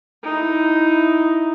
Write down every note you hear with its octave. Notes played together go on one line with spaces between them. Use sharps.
D#4 E4